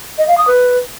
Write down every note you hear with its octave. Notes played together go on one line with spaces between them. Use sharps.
D#5
F5
D#6
B4